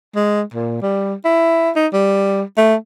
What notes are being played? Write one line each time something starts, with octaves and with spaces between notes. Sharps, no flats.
G#3
A#2
G3
E4
D#4
G3
A3